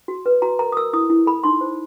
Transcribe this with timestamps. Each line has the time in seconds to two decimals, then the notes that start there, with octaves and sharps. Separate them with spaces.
0.08 F#4
0.26 B4
0.42 F#4 A#5
0.59 A#4 A#5
0.72 D#6
0.77 A#4 E6
0.93 E4 D#6
1.10 E4
1.27 A4 B5
1.44 D#4 C6
1.61 C5